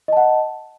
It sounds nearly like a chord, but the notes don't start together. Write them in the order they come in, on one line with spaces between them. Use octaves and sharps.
D#5 A5 F#5